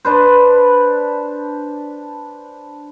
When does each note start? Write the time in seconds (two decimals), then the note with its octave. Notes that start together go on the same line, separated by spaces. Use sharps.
0.05 D4 B4 C5